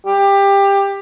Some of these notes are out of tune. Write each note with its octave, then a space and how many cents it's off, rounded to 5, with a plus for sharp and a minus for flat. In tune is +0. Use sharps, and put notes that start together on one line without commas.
G4 +20